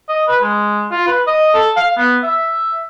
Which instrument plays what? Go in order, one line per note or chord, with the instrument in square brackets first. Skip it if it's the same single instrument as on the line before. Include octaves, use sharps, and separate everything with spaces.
[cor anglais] D#5
B4
G#3
F4
B4
D#5
A4
F5
B3
E5